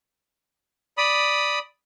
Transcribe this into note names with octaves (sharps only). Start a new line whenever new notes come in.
D5 B5 D#6